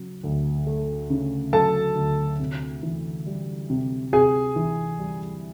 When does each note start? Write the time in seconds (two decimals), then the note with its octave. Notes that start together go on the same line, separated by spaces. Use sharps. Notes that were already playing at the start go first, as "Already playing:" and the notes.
Already playing: C#3 F#3
0.24 D2
0.67 A3
1.10 C#3
1.53 F#3 A4 A5
1.96 D2
2.39 C3
2.83 E3
3.26 G3
3.70 C3
4.13 C3 G#4 G#5
4.56 E3
4.99 G3